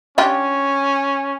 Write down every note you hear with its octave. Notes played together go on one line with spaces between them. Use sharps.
C#4 D4 F4 G4